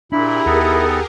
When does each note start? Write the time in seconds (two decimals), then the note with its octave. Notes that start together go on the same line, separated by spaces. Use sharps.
0.12 A#2 D4 E4 G4 G#4 A#4 B5
0.46 D#2 B3 D#4 A4